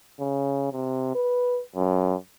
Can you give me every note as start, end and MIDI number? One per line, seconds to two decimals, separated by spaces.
0.19 0.68 49
0.72 1.12 48
1.15 1.61 71
1.76 2.15 42